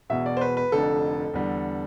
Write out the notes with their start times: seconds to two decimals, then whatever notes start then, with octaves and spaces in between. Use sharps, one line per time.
0.10 E1 E2 B2 E5
0.26 D5
0.37 C5
0.41 B4
0.57 B4
0.72 F1 F2 D3 A4
1.34 E2 D3 G3